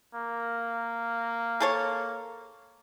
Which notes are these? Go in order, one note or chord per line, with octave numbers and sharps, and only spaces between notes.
A#3
G#4 A4 C#5